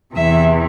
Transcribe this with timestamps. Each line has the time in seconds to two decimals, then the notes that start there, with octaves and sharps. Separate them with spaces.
0.15 E2 C3 E3 E5